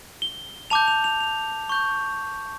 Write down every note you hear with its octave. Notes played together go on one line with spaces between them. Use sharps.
G7
A5 D6 G6 F7
F7
F7
F7
C#6 G6